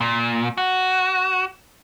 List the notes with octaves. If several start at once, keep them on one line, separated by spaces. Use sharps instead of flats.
A#2
F#4